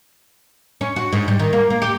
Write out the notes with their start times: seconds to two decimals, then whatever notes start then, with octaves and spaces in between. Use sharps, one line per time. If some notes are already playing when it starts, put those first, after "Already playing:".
0.81 C#4
0.96 F#4
1.12 G#2
1.28 G3
1.39 D#3
1.53 A#3
1.70 A#3
1.82 G4